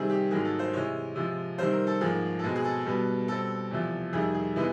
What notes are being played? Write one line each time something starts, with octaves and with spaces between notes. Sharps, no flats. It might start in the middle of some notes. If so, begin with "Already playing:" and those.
Already playing: C3 D#3 G3 C4 G#4
G4
G#2 D#3 F#3 A#3 G#4
A4
C5
C3 E3 G#3 C#5
C3 F3 G#3
C3 D#3 G3 C4 C5
A#4
A4
G#2 F3 A#3 G#4
A4
B2 G#3 C4 G#4
G#4
A4
B2 G3 B3
B2 G3 C4 A4
E2 C3 F3
F2 C3 D#3 G3 G#4
G#4
C3 E3 G#3 B3